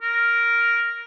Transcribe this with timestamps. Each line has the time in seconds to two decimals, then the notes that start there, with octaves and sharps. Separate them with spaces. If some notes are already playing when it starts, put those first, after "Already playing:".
0.02 A#4